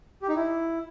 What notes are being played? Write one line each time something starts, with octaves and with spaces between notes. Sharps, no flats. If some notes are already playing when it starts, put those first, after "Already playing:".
G4
D#4
E4